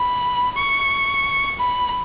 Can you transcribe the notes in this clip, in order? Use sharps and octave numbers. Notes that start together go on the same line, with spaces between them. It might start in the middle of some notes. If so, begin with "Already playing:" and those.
Already playing: B5
C#6
B5